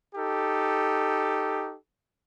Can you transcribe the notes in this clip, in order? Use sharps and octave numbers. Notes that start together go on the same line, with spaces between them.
D#4 G4 A4